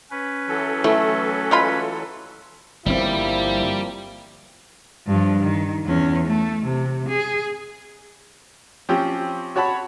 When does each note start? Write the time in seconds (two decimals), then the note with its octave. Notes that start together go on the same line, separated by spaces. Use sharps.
0.11 C#4 B4
0.48 E3 F#3 A4
0.84 A3 E4
1.51 G#3 F4 B5
2.86 G1 F3 G3 A#3 C4 E4
5.07 G2 F3
5.43 D#3
5.85 E2 C#4
6.27 A3
6.65 C3
7.08 G#4
8.89 F3 C4 C#4 G4
9.56 F#4 C#5 F#5 A5 B5